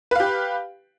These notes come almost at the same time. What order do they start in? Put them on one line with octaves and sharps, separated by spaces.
B4 F5 G4